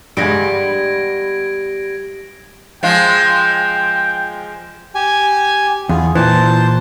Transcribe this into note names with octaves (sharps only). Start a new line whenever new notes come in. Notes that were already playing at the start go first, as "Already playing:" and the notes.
G2 G3 G#3 B3 G#6 A#6 D7
F3 G#3 F4 G5
G4 G#5
E2 F4 G#4
A#2 E3 C5 A5